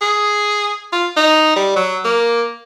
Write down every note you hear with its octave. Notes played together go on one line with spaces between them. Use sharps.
G#4
F4
D#4
G3
F#3
A#3